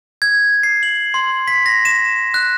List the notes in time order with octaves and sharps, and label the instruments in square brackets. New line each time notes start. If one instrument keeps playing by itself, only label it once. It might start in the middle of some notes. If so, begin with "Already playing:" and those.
[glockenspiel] G#6
C7
F#7
C6
B6
A#6
E7
F#6